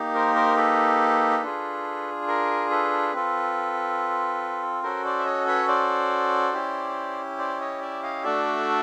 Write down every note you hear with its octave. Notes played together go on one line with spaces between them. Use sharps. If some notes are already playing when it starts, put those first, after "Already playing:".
Already playing: A#3 D#4 G4
A#4 C5
A#4 C5
A4 B4
D4 F4 G#4
A#4
A4 B4
C4 F4 A4
C#4 F#4 A4 A#4 C5
C5 D5
E5
C#5 D#5
B4 C#5
C5 D5
C#4 E4 G4
C5 D5
C#5 D#5
D5 E5
D#5 F5
A3 D4 F#4 A4 D5 E5